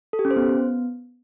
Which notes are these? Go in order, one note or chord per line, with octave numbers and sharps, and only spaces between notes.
A4
G4
C#4
C5
B3